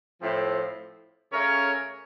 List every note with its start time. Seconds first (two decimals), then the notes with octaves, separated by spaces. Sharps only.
0.21 A2 F3 C4
1.32 C#3 A3 C#4 A#4 C#5